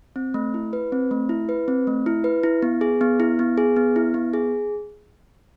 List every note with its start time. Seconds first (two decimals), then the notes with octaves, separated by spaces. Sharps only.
0.16 C4
0.34 A3
0.54 E4
0.73 B4
0.92 C4
1.11 A3
1.29 E4
1.49 B4
1.68 C4
1.87 A3
2.06 E4
2.24 B4
2.43 E4
2.62 B3
2.81 G#4
3.01 B3
3.20 E4
3.39 B3
3.58 G#4
3.76 B3
3.96 E4
4.14 B3
4.34 G#4